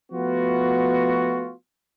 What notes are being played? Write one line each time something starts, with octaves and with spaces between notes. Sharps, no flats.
F3 A3 B3 F4 F#4